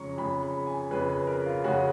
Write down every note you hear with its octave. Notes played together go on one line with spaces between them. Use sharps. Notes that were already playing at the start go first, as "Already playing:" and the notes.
Already playing: F2 C#3 G#3 C#4 A#5 C#6
F2 C#3 G#3 C#4 B5
B5
G#5
F2 C#3 G#3 C#4 B4
B4
A#4
F4
F2 C#3 G#3 C#4 F#4